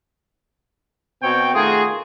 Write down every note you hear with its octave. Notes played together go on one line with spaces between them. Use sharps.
B2 C4 C#5 G5
D#3 A3 F4 F#4 G#4